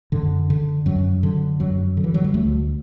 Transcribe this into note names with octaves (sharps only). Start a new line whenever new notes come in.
F#2 D3
D3
F#2 F#3
D3
F#2 F#3
D3
E3
F#3
G3
D2 A3